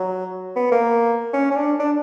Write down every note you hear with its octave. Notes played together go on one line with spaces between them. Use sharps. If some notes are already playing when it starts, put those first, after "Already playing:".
Already playing: F#3
B3
A#3
C#4
C#4
D4
D4